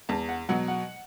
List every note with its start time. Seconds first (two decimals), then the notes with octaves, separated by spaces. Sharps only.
0.09 E2 A5
0.29 F#5
0.49 B2 F#3 F#5
0.68 F#5